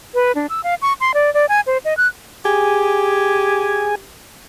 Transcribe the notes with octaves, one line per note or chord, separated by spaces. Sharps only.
B4
D4
E6
F5
C#6
C6
D5
D5
G#5
C5
D#5
F#6
G4 G#4 G#5